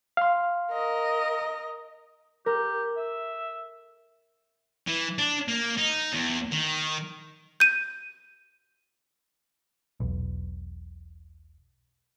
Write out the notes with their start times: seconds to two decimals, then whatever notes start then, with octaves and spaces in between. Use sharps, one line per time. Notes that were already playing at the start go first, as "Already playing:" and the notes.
0.17 F5 C6
0.72 A#4 D#5
2.46 G4 A#4
2.97 E5
4.87 E3
5.18 D4
5.48 A#3
5.78 D#4
6.13 E2
6.52 D#3
7.60 G6 D#7
10.00 E1 B1